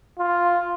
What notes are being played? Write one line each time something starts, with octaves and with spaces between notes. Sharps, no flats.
F4